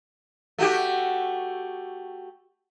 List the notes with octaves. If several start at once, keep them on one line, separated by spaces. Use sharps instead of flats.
A3 F#4 G4